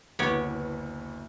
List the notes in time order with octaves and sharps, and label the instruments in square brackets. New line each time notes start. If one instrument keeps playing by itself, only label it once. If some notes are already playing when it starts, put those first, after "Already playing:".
[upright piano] F#1 D2 E3 [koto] B3 G4 C#5